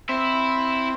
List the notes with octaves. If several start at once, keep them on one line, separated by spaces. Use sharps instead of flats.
C4 E4